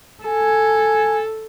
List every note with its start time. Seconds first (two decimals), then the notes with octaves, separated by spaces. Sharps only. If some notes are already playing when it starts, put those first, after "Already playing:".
0.24 A4 G#5